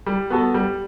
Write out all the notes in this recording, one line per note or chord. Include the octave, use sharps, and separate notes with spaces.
G3
B3 F#4 A4
G3